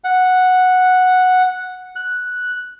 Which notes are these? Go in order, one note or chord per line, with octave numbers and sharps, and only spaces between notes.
F#5
F#6